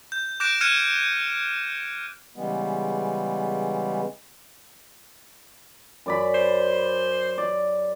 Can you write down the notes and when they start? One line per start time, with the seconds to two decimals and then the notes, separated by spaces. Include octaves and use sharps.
0.12 G6
0.40 D6 F#6 G6 A#6 D7 E7
0.61 F6 F#6 G#6 C#7 D#7 E7
2.36 C#3 E3 G3 G#3 B3
6.06 F#2 D5 B5
6.34 C5
7.38 D5